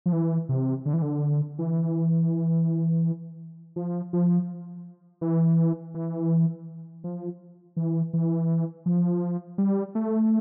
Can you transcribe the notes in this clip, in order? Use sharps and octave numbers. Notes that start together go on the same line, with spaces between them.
F3
E3
C3
D3
E3
D3
E3
F3
F3
E3
E3
F3
E3
E3
F3
G3
A3